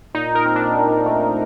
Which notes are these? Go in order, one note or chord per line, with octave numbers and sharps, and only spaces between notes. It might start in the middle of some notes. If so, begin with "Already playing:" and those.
A#2 D#4
A#4
C4
D4
A#2
A3